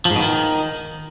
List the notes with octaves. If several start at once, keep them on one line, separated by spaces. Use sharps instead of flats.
F3
G#2
B2
D#3